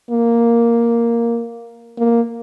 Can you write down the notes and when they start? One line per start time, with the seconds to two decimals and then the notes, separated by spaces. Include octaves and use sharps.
0.11 A#3
1.99 A#3